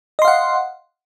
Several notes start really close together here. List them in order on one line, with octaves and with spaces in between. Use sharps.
D#5 C6 F5 F#5